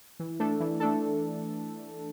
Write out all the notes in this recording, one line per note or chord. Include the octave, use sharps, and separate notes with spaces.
E3
A3 D4 A4
E3
A3 D4 A4